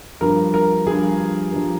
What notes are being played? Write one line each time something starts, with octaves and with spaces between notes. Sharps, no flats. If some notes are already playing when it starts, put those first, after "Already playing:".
G2 F3 A#4
A#4
G2 F3 G#4
G2 F3